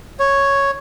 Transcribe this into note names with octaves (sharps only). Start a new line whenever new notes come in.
C#5